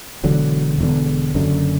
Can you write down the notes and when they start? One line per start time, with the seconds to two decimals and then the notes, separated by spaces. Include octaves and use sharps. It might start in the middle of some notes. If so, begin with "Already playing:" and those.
0.24 E1 E2 D3 F#3
0.78 E1 E2 D3
1.35 F#1 F#2 D3